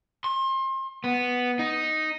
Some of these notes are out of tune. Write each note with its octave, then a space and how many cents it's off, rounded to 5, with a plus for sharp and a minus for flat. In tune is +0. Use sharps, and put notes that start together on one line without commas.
C6 +35
B3 +0
D#4 +0